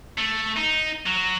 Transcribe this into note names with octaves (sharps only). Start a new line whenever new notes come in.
A3
D#4
F#3